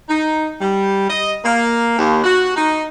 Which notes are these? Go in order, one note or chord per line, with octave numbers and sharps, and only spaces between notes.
D#4
G3
D#5
A#3
D#2
F#4
D#4